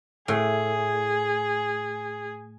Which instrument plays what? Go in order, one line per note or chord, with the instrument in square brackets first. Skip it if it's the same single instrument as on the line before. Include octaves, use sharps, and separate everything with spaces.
[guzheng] A2 [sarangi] G#4